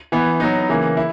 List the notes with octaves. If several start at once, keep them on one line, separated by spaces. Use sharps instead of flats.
E3 B3 E4
F#3 B3 D#4
C#3 E3 A#3
E4